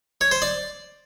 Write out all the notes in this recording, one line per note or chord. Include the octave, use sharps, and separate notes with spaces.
C#5
C5
D5